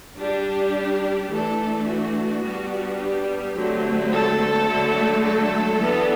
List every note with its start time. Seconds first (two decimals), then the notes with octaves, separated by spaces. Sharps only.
0.18 G3 D4 G4
1.31 E3 A3 D4 A4
1.88 F#4
2.44 G3 B3 D4
2.99 G4
3.55 D3 F#3 A3 C4
4.12 A4
4.68 D3 F#3 A3
5.24 A4
5.81 E3 B3 D4